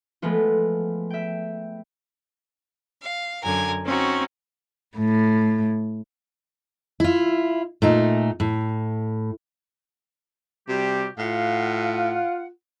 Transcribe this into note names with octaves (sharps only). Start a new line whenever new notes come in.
F3 G#3 A3 B3 F4
E5 G5
F5
F#2 D3 A#4 G#5
C4 C#4 D#4 F#4
A2
E4 F4
A#2 A3 D#4
A2
C3 G3 F#4 G4
A2 F4 F5 F#5